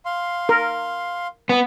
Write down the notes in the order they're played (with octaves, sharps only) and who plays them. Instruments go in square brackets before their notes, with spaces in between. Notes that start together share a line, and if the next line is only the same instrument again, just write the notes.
[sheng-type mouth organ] F5 C6
[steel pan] A#4
[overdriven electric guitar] B3